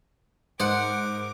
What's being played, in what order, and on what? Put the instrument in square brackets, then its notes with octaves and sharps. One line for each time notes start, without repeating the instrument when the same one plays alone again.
[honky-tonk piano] G#2 [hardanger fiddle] A#4 D6 [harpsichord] C5 [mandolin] D#5 F#5